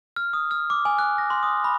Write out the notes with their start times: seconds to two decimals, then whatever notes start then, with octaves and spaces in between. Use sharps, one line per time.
0.16 F6
0.33 D#6
0.51 F6
0.70 D6
0.85 G#5
0.99 F#6
1.18 A#6
1.30 C6
1.43 D#6
1.64 B5